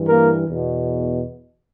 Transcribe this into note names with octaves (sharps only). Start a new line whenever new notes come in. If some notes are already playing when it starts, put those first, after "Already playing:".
Already playing: G2 E3
A#3 A#4
E2 B2